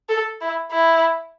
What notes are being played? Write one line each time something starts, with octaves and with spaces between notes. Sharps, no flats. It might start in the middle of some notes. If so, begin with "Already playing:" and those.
A4
E4
E4